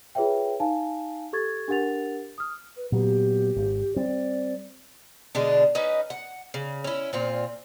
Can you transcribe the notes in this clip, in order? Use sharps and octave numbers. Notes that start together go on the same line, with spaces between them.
F4 G#4 B4 C#5 E5 G5
D#4 F5 G#5 A5
G4 A4 C#6 G#6 A6
D4 G4 A#4 F#5 A6 F7
D#6 F6
B4
A#2 F#3 B3 G4
G#1
G3 C4 D5
B2 D3 G#3 D4
C#4 D#4 B4 D#5
F#5
C#3
C#4 E4
A#2 C4 F4